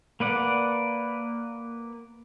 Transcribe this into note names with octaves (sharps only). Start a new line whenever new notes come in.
A#3 B4 D5 F#5